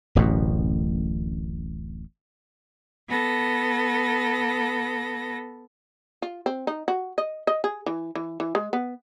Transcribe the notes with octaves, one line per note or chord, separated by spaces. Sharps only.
D1 A1 F#2 B2
B3 A4 A#6
F4
C4
D#4
F#4
D#5
D#5
G#4
E3
E3
E3
G#3
B3